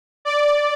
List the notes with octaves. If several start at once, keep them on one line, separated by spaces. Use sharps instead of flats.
D5